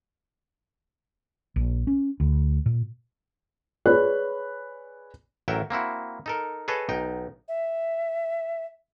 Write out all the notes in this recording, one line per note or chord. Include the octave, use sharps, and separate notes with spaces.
A#1
C#4
D2
A#2
G#4 B4 C#5 D5 B5 F#6
A1 F#3 F#4 A#4 E5 G5
A#3 C4 E4 F#4
D#4 A4 A#4
G#4 A4 B4 C#5 D#5 A5
B1 D#4 G5
E5